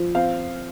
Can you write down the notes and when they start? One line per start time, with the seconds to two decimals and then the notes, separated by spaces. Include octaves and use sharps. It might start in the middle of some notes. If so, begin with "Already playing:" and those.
Already playing: F3
0.15 C4 F5